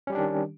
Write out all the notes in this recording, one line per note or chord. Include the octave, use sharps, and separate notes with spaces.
D#3 G3 C#4 D4 G4